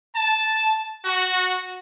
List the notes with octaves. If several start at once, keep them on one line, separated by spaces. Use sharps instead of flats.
A5
F#4